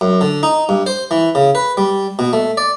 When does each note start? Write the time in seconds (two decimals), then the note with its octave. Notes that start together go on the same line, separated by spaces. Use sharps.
0.01 F#2
0.21 D3
0.43 D#4
0.69 G2
0.86 C5
1.11 E3
1.35 C#3
1.55 B4
1.77 G3
2.19 B2
2.33 A3
2.57 D5